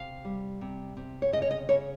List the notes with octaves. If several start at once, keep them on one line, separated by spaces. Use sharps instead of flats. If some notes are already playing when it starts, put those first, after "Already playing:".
Already playing: C3 F5
G3
C3
C3
C#5
C#3 D#5
C#5
D#5
C#3 C#5